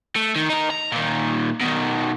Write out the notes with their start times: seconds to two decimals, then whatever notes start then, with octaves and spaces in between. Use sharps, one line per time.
0.16 A3
0.36 D#3
0.50 D#4 A#4
0.71 A#5
0.92 A#2 D#3
1.61 B2 D#3